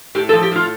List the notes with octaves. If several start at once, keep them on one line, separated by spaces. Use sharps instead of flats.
A2 G4
A4
F3
G4
A2 F4